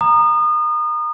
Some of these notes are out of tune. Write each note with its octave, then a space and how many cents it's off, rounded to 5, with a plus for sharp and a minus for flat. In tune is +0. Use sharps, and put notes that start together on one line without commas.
A#5 +0 D#6 -30